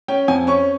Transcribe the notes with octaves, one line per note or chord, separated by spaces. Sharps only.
C#4 G5
F2 G#5
C#4 C#6